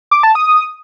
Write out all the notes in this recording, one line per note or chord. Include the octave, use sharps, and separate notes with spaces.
D6
A5
D#6